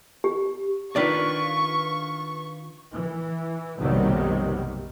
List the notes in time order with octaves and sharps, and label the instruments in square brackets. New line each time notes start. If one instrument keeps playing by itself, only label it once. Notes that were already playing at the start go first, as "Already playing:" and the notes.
[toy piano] G4
[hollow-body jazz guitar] D#3 D5 [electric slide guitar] D4 F4 B4 [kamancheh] C#6
[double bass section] E3
F#1 B1 C3 D#3 F#3 G3